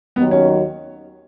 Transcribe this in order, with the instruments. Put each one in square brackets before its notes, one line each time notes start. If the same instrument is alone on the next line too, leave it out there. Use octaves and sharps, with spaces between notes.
[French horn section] D#2 D#3 F#3 [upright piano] B3
[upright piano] C#4